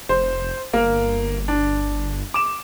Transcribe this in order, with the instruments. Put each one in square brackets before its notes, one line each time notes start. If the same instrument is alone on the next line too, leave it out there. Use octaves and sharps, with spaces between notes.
[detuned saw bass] F1 [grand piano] C5
[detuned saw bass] G1 [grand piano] A#3 A#4
[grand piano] D4
D6 E7